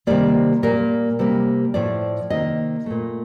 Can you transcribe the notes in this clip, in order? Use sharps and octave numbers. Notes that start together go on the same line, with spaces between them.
C3 D#3 G3 A#3 D5
A#2 G3 A#3 A#4
C3 G3 A#3
A2 F3 A3 D5
C3 D#3 A#3 D#5
A#2 A3